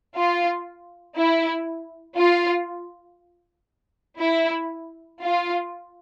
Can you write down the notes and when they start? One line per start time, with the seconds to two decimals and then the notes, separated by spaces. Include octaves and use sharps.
0.16 F4
1.16 E4
2.18 F4
4.19 E4
5.21 F4